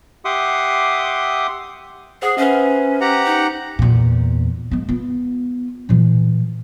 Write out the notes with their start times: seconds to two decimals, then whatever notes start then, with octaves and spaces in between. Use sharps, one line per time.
0.25 G4 E5 F#5 C6 D6 D#6
2.22 G#4 C5 F#5
2.38 C#4 B4 C5 E5
3.01 G4 F#5 A#5
3.26 D#4
3.79 E2 A#2
4.72 G#3 B3
4.89 B3 F4
5.89 A#2 E3